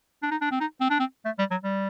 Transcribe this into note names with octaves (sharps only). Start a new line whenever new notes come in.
D4
D#4
D4
C4
D#4
C4
D4
C4
A3
G3
F#3
G3